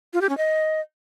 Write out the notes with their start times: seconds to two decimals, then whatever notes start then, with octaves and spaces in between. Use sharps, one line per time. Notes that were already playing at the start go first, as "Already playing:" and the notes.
0.13 F4
0.21 G4
0.29 C#4
0.37 D#5